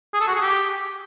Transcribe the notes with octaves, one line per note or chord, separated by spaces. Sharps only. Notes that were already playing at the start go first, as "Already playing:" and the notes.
G#4
A4
F#4
G#4
G4